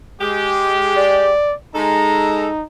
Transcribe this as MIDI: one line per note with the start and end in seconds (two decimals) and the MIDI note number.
0.20 1.32 56
0.20 1.32 67
0.97 1.54 74
1.75 2.48 56
1.75 2.65 63
1.75 2.48 69
1.75 2.48 82